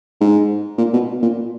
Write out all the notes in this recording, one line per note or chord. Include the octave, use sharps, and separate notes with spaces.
G#2
A#2
B2
A#2